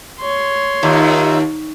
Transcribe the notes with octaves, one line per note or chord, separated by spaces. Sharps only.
C#5 C6
D#2 D#4 F4 E5